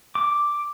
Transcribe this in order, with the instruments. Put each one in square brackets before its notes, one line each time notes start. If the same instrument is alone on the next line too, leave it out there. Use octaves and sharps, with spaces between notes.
[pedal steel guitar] D6